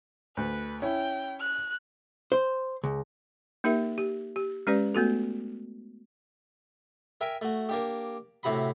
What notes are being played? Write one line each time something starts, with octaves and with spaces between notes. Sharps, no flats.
D2 B4
C#4 E4 G5
F#6
C5
C#2
A#3 D#4 G4 A#4 E5
G4
G4
G#3 C#4 G4 B4 D5
A3 B3 F#4 A4
A#4 E5 G5 G#5
A3 F#4
A#3 D4 G4
A2 C3 F#4 A#5 B5